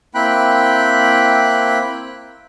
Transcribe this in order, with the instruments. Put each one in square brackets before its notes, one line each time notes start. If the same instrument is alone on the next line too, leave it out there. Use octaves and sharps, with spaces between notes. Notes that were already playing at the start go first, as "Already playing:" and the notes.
[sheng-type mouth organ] A#3 C4 E4 G5 B5 F#6